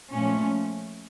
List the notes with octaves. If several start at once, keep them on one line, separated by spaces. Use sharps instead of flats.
A#2 F3 A3 C#4